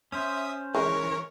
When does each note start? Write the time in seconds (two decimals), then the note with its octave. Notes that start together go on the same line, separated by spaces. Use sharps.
0.12 C#4 C5 E5 D#6
0.75 E3 G#3 A#4 C#5